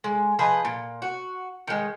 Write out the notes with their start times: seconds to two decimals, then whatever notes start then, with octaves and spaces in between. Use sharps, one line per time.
0.04 G#3
0.39 F3 G#4 B4 D#5
0.65 A#2
1.02 F#4
1.68 D#3 G#3